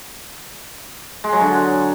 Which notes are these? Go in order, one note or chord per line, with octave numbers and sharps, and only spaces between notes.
G#3
F#3
D3